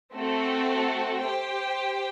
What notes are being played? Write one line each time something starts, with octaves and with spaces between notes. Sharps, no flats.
A3 C4 F#4 A4
G4 C5 G5